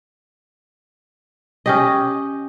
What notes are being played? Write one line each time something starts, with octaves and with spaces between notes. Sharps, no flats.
C#4 G4 D#5